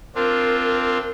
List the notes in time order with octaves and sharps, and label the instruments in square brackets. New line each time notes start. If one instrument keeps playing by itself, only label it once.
[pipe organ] C4 D4 F4 [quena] A#4